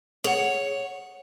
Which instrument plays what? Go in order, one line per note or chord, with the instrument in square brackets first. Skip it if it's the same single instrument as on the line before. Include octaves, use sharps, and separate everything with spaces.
[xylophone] G#4 F#5 [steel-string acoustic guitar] C#5